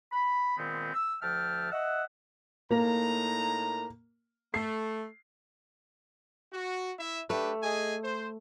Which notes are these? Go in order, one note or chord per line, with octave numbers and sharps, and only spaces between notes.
B5
A#2 D#3 G#3 B3 C4
E6
D2 F3 E5 G5 A5 F6
D#5 E5 F#5
A2 A#3 D#4 A#5
A3 C7
F#4
E4 E5
A3 D4 G4 B4
G#4 D#5 G#5
C5